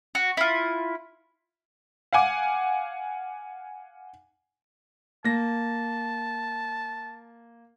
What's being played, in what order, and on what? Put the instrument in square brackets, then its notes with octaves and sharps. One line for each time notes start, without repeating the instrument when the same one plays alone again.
[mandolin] F#4
E4 F4
[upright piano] F5 F#5 G#5 D6
[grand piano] A#3 A#6 [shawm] A5